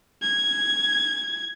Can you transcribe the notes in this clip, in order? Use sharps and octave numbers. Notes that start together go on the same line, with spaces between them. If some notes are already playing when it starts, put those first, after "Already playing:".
G#6